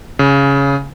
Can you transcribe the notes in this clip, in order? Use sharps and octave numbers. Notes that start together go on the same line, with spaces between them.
C#3